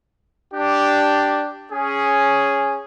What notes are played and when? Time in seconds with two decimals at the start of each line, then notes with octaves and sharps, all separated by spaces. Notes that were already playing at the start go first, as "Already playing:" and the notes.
0.54 D4 G4
1.72 C#4 G#4